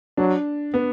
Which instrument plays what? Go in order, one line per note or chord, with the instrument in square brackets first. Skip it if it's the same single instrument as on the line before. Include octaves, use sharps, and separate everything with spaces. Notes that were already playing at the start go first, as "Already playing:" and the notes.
[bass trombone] F#3 [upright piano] D4
[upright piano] B3